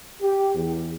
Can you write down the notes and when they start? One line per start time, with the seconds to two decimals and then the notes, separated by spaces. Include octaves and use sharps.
0.21 G4
0.55 E2